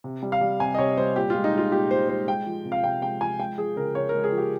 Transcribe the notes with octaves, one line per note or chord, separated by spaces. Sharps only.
C3
G3
F5
G3
C3 G#5
D#5
C3 C#5
G3 C5
A#2 G4
G#3 F4
D#4
G#3 F4
A#2 G4
A#2 C5
G#3 C5
G#3 G5
F3
C3
F5
C3 G5
G#3 G5
F3 G#5
G#3 G5
F3 G#4
C#3 A#4
C#3 C#5
A#4
G#3
G#4
F3
G4